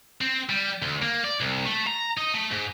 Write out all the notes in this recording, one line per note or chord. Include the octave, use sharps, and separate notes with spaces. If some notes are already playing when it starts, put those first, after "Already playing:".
C4
G3
D2
A#3
D5
C2
A3
A#5
D#4
A3
G#2